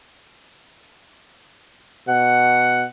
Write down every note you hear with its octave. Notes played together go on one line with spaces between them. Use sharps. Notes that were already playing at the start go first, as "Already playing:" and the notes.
B2 F#5